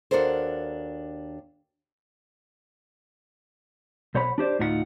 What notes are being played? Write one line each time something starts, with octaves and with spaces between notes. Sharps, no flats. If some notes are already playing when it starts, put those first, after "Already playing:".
D#2 D4 F#4 A4 A#4 C5
B1 C5 C#5 F#5 B5
D4 G4 C5 D5
D2 A2 D#4 F4 A#4 F#5